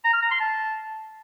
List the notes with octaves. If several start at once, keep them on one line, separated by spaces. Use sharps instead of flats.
A#5
F6
A#5
C6
A5